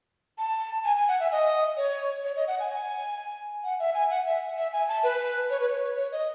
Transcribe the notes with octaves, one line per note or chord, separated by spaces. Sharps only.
A5
G#5
G#5
F#5
E5
D#5
C#5
C#5
D#5
F#5
G#5
F#5
E5
G#5
F#5
E5
E5
G#5
A5
B4
C#5
B4
C#5
C#5
D#5